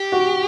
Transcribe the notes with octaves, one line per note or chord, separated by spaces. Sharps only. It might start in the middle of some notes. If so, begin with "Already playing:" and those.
Already playing: G4
F#4